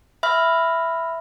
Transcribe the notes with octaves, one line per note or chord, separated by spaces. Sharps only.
E5 B5 F6